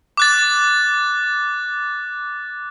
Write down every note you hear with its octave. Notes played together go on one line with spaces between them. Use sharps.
D6 F#6 A6